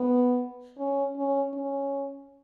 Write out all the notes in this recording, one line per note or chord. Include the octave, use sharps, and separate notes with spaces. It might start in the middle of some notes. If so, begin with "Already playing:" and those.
Already playing: B3
C#4
C#4
C#4